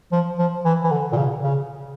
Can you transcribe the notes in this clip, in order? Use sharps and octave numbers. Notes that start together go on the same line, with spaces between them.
F3
F3
E3
E3
D3
A#2
C#3
C#3